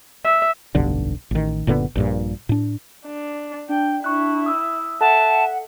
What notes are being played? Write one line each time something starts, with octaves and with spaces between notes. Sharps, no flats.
E5
F1 B1 G2 D3
A1 D#3
F#1 A#2 D3 B3
A#1 G2 A#2
A2 D4
D4
D4 G5
E4 C#6 F#6
D#6 E6
A4 E5 F#5 A5